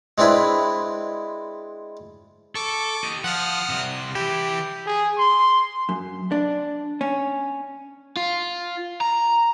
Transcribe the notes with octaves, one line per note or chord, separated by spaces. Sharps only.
G#3 C4 D4 E4 B4
A4 C#6 D6
G4 D#5
F3 F#5 D#6 F6
C2 C3
E3 E4 G4
G#4
C6
F#2
D4
C#4
F4
A#5